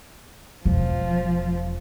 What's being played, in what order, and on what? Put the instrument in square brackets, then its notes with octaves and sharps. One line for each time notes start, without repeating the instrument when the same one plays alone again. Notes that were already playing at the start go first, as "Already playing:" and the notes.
[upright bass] E1 [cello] F3